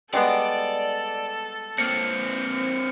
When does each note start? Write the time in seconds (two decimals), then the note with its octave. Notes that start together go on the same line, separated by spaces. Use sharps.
0.14 G3 G#3 B3 A4 D5
1.78 A#3 C4 C#7